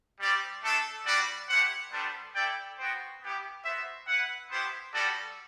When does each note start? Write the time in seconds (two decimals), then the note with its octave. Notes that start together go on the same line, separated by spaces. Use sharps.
0.19 G3 C4 G4 D5
0.62 A3 D4 A4
1.05 G3 D4 F#4 B4 D5
1.49 A3 E4 G4 C5 F#5
1.92 G3 B3 D4 A4 C5
2.35 E4 A4 D5 G5
2.78 B3 F#4 C5 G5
3.21 B3 E4 G4
3.64 B3 F#4 C5 E5
4.07 E4 B4 F#5
4.51 B3 E4 G4 C5
4.94 G3 B3 F#4 A4 D5